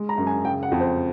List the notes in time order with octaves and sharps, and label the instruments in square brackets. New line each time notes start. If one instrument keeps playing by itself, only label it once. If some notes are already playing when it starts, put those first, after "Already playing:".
Already playing: [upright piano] G#3
A#5
F#2
G#5
C#3 G5
F#5
F2
C5